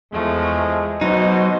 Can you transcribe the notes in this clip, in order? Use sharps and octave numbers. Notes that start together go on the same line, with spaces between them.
E2 F3 G#3 A3
B2 F#3 D#4 C5